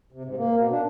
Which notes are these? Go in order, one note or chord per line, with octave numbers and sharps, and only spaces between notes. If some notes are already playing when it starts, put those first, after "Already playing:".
C3
G#2
A#3
B2
D4